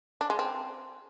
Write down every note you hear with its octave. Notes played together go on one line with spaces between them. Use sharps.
D4
G#3
C4